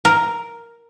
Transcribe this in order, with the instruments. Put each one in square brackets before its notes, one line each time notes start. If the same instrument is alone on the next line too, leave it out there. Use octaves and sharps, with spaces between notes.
[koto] A#4